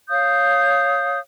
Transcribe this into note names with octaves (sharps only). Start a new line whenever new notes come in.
C#5 F5 D#6 G6